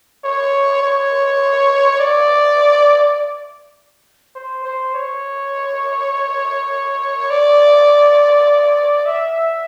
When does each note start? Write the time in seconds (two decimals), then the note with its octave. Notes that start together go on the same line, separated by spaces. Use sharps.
0.24 C#5
0.83 C#5
2.00 D5
4.35 C5
4.64 C5
4.95 C#5
7.30 D5
9.06 E5